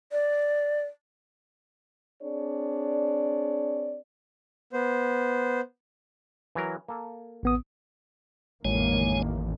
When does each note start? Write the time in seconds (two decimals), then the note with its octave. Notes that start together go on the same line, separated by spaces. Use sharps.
0.12 D5
2.22 C4 D4 G#4 C#5 D5
4.73 B3 C5
6.55 E3 F#3 A#4
6.88 A#3 A4
7.43 A1 B3 D#6
8.65 A1 F2 D#3 G#3 A#3 C#5 G#5